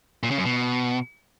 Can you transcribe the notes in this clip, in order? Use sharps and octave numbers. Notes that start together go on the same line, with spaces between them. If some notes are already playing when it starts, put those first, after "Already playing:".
A#2
C#3
F#2
B2